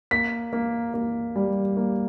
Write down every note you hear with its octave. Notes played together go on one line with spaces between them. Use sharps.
A#3 B6
A#3
A#3
G3
A#3